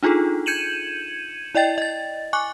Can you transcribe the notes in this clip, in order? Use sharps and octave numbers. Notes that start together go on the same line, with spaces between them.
D4 D#4 F4 G#4 A4
G6 G#6 C#7 D#7 E7 F#7
E4 D5 D#5 G5 A6
D#5 A6
G#5 C#6 D6 F#6